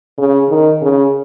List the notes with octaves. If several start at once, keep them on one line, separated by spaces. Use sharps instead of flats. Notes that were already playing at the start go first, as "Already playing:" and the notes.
C#3
D#3
C#3